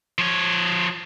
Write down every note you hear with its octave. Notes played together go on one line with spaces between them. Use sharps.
F3 C#5